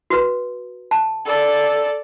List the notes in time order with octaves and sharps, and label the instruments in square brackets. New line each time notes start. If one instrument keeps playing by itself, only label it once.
[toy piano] F#4 B4
A5
[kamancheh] A4 D5